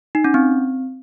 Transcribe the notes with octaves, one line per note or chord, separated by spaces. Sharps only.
D#4
C#4
C4